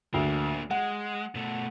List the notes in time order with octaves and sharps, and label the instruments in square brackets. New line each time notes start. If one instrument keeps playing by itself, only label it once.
[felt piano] D2 [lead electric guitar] A#3 D4
[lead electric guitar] G#3 [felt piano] F#5
[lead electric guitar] B2 A3